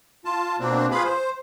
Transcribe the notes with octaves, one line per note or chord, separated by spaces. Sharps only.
F4 A5
B2 A#3 C4 D4
F4 G#4 B4 F5 B5
C5